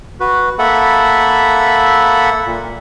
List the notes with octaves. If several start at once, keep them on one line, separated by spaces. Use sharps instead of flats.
F#4 B4
A#3 A4 E5 F#5 B5
A#2